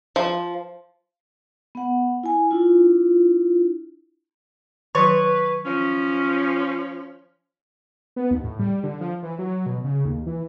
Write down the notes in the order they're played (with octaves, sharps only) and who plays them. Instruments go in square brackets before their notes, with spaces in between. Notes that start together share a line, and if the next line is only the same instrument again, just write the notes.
[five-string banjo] F3
[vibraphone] B3 F#5
E4 G#5
D4 E4 F4
[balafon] D#3 F#3 [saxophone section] B4 [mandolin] C#5
[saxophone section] F3 C#4
[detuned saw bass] B3
D#2
A2
G3
D3
F3
E3
F#3
B2
C#3
D#2
E3